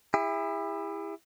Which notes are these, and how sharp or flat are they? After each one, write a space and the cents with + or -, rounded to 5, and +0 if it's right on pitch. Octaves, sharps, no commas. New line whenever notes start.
E4 +0 G#4 -45